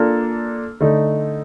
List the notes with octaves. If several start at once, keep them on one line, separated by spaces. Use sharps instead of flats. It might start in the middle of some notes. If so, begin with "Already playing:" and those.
Already playing: A#3 D4 F4 A4
D3 A3 D#4